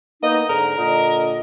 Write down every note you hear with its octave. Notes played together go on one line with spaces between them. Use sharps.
A#3 B3 D#4 D#5
G#2 D3 A#4 A#5
A#2 D3 D#5